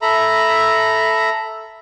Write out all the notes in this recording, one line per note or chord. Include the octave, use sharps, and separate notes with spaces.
A4 E5 A#5 B5